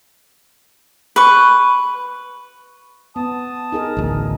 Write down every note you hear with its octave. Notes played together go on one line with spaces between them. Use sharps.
B4 C#6
B3 A5 D#6
D#4 G#4 A#4
A1 D2